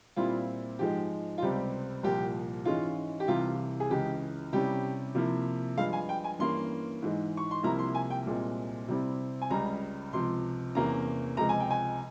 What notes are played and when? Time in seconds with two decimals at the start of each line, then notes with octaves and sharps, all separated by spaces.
0.17 A#2 G3 C4 E4 F4
0.79 G#2 F3 G#3 G4
1.38 F4
1.42 C#2 C3 G3 C4 G4
2.03 C2 A#2 F3 G4
2.65 G#2 E3 G#3 C#4 F4
3.20 G4
3.28 C2 C3 E3 F4
3.80 G#4
3.90 C#2 C#3 E3 G4
4.53 C3 G3 C#4 E4 G4
5.15 C3 F3 A#3 E4
5.77 G2 F3 G#3 F5
5.93 G#5
6.09 G5
6.24 G#5
6.39 G2 E3 A#3 C#4 C6
7.02 G#2 E3 G#3
7.37 C#6
7.51 C6
7.63 C2 C3 F3 A#3 E4 A#5
7.79 C6
7.95 G#5
8.10 G5
8.26 C2 A#2 G#3 C4
8.88 C3 G3 C4 E4
9.42 G#5
9.50 C#2 C#3 G3 A#5
10.13 C#2 C3 F3 C6
10.75 E2 C3 E3 A#3 C#4 A#5
11.37 C#2 C3 F3 G#3 A#5
11.49 G#5
11.60 G5
11.71 G#5